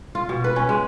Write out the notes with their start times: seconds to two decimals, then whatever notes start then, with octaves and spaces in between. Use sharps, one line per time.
0.15 F4
0.29 B2
0.44 B4
0.56 C#4
0.69 G#3